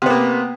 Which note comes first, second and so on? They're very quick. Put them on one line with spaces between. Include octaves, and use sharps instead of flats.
C3 B3 A#3